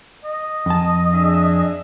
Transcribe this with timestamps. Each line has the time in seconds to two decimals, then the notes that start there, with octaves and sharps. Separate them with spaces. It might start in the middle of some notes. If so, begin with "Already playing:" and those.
0.25 D#5
0.66 F2 A5
1.13 D4 G#4 E5